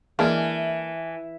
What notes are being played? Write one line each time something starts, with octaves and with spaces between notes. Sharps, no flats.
E3 G#3 A#3 D4 E5 A5 F6